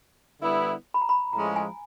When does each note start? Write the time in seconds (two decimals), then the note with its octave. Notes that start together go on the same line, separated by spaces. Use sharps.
0.40 D3 G3 B3 E4
0.94 B5
1.02 A#5
1.09 B5
1.33 A2 F3 G#3 C#4 A#5
1.56 G#5